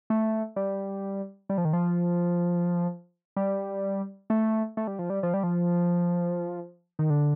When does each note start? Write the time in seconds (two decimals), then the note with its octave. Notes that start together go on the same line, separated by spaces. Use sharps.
0.10 A3
0.56 G3
1.49 G3
1.58 F3
1.65 D#3
1.73 F3
3.36 G3
4.30 A3
4.77 A3
4.87 G3
4.99 F3
5.10 G3
5.23 F3
5.34 G3
5.43 F3
6.99 D#3
7.10 D3